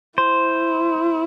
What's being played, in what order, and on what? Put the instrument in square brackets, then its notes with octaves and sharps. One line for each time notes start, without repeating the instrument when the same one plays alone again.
[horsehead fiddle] E4 [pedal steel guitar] C5